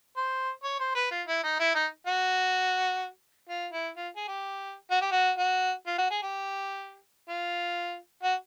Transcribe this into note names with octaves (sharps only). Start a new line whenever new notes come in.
C5
C#5
C5
B4
F4
E4
D#4
E4
D#4
F#4
F4
E4
F4
G#4
G4
F#4
G4
F#4
F#4
F4
F#4
G#4
G4
F4
F#4